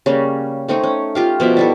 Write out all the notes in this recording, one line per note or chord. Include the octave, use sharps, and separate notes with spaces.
C#3 G3 A#3
A3 C4 D#4 C#5
C#4
F4 G4 F5
B2 F3 G4 E5
G3 E4 A4